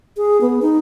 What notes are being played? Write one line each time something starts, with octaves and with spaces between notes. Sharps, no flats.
G#4
B3
D#4